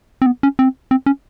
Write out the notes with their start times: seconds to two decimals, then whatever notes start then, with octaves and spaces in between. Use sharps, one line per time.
0.22 C4
0.26 B3
0.43 C#4
0.59 C4
0.91 C4
1.06 C#4